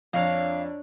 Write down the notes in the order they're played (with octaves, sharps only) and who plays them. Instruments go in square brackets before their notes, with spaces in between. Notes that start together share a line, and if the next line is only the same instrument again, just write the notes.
[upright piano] F2 [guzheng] D4 C#5 A#5 [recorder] F5